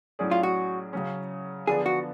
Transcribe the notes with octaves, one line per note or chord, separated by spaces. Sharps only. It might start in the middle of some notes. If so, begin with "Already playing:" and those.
A2 F#3 C#4 G#4 D5
F4
F#4
C#3 F#3 C#4
D3 F3 B3 D4 G#4
F#4